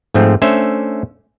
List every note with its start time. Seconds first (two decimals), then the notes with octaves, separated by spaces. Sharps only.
0.14 G#2 F3 A3 C4
0.42 A3 C#4 D4 C5 E5